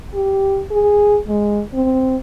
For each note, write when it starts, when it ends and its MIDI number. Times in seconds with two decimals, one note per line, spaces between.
0.14 0.62 67
0.71 1.18 68
1.28 1.62 56
1.74 2.16 60